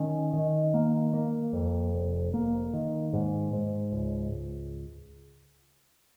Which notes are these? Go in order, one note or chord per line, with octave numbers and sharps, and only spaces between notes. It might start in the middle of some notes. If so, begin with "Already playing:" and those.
Already playing: D#3 C#4
D#3
A#3
A#3
F2
F1
A#3
D#3
G#2
G#2
C#2